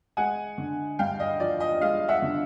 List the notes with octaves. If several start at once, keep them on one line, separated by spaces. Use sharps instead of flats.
G#3 F#5 G#5
D3
G2 F5 G5
D#5
F3 D5
D#5
G#3 D#5 F5
E5 F#5
D3